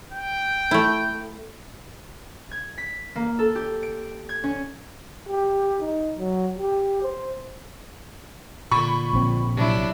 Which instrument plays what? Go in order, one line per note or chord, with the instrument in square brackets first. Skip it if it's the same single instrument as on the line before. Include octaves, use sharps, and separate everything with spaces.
[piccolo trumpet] G5
[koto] A3 E4
[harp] G#6
B6
A#3
A4
G4
D7
G#6
C#4
[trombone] G4
D#4
F#3
G4
C5
[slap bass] A#2 D3 [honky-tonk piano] B5 C#6
[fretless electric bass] A#1 C4
[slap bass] C3 F#3 [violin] D4 E4